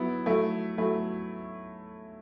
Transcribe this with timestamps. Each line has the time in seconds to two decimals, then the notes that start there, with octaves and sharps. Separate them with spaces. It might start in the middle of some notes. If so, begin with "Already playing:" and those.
Already playing: F#3 B3 E4
0.26 F#3 A3 E4
0.78 F#3 A3 E4